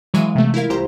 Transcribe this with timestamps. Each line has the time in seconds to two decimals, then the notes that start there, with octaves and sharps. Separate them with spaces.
0.14 E3 F#3 G#3 E5 F5 D#7
0.35 C3 A3
0.54 E4 F4 A#4 F5
0.70 C2 G4 C5 A#5 C6